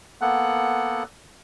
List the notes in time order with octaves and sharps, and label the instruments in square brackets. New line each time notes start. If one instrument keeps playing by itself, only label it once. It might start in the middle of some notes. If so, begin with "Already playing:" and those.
[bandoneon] A#3 B3 A4 F#5 F#6